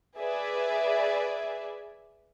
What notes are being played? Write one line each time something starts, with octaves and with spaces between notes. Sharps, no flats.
G#4 B4 D5 E5